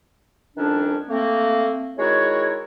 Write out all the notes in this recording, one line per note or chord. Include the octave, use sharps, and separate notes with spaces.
F2 D#3 G3 C#4 D4
A3 A#3 C4
D#3 G#3 E4 F#4 C#5